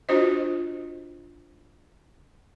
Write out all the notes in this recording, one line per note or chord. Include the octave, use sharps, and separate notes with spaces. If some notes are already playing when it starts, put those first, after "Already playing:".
D4 F4 F#4 C5 D#5